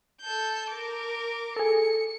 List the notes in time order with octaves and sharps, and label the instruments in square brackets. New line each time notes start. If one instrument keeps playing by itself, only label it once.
[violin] A4 G6
A#4 D6
[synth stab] G#4 A4 [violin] C#7